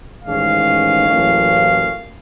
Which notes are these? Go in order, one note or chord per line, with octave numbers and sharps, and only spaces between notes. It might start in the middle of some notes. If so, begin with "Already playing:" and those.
A1 G#2 D#3 G#3 C#4 F5
A1 A2 F#3 A#3 C#4